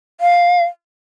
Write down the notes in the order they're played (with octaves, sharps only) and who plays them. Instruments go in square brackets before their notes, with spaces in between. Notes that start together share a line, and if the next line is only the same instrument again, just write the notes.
[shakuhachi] F5